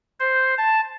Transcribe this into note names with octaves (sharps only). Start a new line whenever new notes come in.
C5
A5